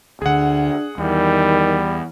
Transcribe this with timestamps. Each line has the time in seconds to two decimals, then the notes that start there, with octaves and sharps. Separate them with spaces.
0.22 D2 D3 D4 G#4 F#5
0.98 E2 D#3 G3